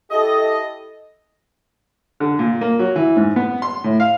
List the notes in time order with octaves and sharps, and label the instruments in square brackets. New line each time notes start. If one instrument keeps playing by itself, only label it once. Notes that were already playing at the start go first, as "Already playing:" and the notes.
[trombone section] E4 G4 A4 [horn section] D#5
[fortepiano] D3
A#2
A#3
F#3
E3
G#2
B3
C6
A2
F5